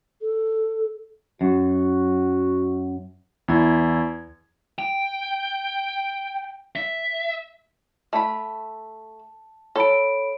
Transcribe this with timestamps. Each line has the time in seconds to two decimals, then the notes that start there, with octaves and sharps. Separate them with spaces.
0.21 A4
1.41 F#2 F#4
3.48 E2 E4 G#6
4.79 G5
6.76 E5
8.13 A3 A5 B5
9.76 A4 C#5 B5 D7